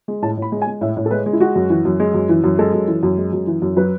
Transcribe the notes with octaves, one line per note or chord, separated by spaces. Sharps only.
G#3
A2 A5
A2
B5
G#3
G#5
G#3
A2 E5
A2
A4
G#3 B4
G#3
E4
G#3 F#4
F#2
E3
F#2
G#3
F#2
E3
F#2
G#3 A4
F#2
E3
F#2
G#3
F#2
E3
F#2
F#3 B4